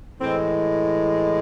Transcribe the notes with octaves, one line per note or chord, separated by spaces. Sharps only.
A2 E3 G#3 C4